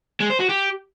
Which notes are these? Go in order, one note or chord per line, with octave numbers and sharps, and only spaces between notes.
G#3
C5
F#4
G4